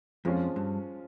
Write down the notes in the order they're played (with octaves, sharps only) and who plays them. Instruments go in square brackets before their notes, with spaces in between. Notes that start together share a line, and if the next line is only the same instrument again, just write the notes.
[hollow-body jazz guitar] F2 [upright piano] F3 G#3 C#4 F4
[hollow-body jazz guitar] G2